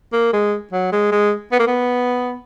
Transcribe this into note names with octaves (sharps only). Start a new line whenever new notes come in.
A#3
G#3
F#3
G#3
G#3
B3
A#3
B3